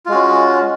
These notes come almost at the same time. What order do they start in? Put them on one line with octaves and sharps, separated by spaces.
F4 G#3 F#4 C#4